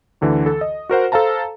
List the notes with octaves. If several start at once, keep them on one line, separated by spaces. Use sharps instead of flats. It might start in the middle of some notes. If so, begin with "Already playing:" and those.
D2 D3 E3
A4
D#5
F#4 A#4 C5 F#5
A4 C5 F5 A5 A#5